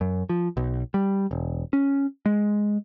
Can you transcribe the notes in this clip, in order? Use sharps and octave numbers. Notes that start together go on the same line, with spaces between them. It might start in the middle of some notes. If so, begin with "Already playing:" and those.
F#2
F3
B1
G3
E1
C#4
G#3